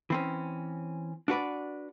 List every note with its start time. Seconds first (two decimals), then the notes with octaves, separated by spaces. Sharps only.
0.10 E3 C4 C#4
1.28 D4 F#4 B4 D5